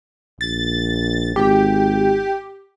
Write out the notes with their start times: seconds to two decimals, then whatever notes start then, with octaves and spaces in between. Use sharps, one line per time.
0.41 A#1 A6
1.36 G#1 G4